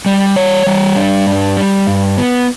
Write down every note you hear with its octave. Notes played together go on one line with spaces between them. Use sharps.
G3
C#5
G3
D4
G2
G3
G2
B3